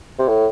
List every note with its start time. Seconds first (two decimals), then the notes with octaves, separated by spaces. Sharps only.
0.19 C3
0.28 A2